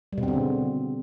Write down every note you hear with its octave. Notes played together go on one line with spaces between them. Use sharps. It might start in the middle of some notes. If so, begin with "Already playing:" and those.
G3
B2
C4
D3
C#3